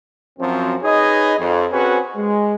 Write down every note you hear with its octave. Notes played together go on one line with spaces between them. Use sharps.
F#2 F3 F#3 C4
D#4 G#4 B4 C#5 D#5
F2
C4 C#4 F#4 G#4 B4
G#3